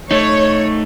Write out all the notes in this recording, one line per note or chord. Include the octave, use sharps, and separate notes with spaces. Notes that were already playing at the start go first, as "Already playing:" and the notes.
A3 D#4 C#5